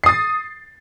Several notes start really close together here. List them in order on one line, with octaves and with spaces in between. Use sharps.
C7 D#6 A6